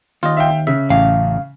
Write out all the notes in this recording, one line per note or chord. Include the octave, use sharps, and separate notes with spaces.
D#2 F4 D#5
E5 F5 G5
C#3 E5
A1 F5